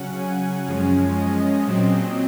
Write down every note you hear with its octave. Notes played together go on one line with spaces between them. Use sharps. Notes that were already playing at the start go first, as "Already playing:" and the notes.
Already playing: C#3 F#3 C#4 F#5
G#5
F#2 F3 G#3 C#4
D#5
A#2 F#3 C4